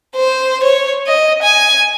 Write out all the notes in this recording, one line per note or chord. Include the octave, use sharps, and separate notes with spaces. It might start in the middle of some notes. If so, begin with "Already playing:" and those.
C5
C#5
D#5
G#5